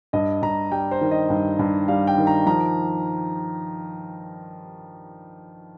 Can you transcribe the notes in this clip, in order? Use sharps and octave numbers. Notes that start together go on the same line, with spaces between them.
G2 D#5
G2 A#5
G3 G5
C5
D#3
D#5
G2
G2
G3 F5
G5
D#3
A#5
F3 A#5